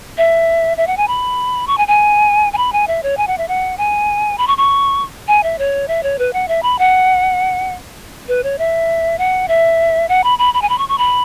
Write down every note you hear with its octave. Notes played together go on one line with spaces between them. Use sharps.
E5
E5
F#5
G#5
B5
C#6
G#5
G#5
G#5
B5
G#5
E5
C#5
G#5
F#5
E5
F#5
G#5
B5
C#6
C#6
G#5
E5
C#5
E5
C#5
B4
F#5
E5
B5
F#5
B4
C#5
E5
F#5
E5
F#5
B5
B5
B5
G#5
B5
C#6
C#6
B5